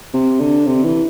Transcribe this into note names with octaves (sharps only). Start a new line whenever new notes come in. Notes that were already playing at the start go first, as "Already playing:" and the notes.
C3
D3
C3
E3